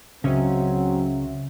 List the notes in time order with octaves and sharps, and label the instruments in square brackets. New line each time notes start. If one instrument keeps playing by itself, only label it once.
[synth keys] C#2 C#4 E5 [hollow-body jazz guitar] C#3 [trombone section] F#3 C4